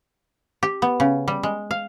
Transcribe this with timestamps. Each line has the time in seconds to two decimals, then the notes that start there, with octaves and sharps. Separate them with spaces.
0.63 G4
0.82 B3
1.00 C#3
1.28 G3
1.43 G#3
1.71 F5